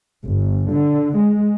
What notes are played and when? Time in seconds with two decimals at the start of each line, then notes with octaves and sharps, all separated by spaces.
0.25 G1
0.71 D3
1.17 G#3